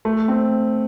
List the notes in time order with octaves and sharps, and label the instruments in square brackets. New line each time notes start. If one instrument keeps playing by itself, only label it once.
[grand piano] A3
C4